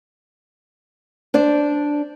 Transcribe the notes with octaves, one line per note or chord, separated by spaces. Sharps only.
D4 C5 D5